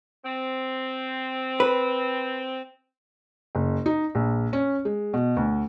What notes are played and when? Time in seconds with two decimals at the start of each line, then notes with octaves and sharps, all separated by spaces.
0.23 C4
1.60 B4
3.55 F#1
3.86 D#4
4.15 A#1
4.53 C#4
4.85 G#3
5.14 B2
5.36 D2